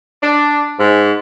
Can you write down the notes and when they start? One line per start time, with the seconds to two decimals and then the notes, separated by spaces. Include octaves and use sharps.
0.22 D4
0.77 G#2